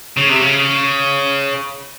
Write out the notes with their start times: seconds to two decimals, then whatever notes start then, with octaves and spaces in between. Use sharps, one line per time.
0.17 C#3
0.29 C3
0.41 C#3